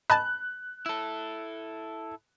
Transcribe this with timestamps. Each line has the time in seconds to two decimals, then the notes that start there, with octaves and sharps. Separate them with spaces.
0.10 D#5 G#5 A5 B5 F#6
0.86 E4 A4